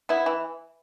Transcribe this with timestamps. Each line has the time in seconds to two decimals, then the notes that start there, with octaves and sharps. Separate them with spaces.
0.09 B3 E4
0.26 E3